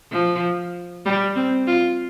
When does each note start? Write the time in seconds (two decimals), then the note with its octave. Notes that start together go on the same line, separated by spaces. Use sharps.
0.11 F3
1.05 G3
1.36 C4
1.67 F4